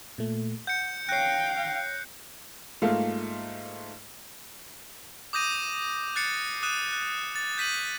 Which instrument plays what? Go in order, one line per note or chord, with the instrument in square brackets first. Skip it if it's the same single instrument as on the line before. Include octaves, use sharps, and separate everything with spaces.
[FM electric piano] A#2 A3
[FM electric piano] F#5 [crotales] G6 C#7
[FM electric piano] C#5 A#6 [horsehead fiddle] F5 G5 [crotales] F#6 C7
[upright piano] G#2 A3 A#3 F4
[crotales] D6 D#6 G6 A#6 D#7
F#6 A6 C7 C#7
D#6 F#6 D#7 E7
F#6
A6
G6 B6 D#7 F#7